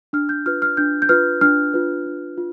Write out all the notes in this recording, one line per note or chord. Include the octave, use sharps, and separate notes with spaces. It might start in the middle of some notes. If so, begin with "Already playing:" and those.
D4 F6
G6
F4 B4 F6
F6
D4 G6
G6
F4 B4 F6
D4 F6
F4 B4
D4
F4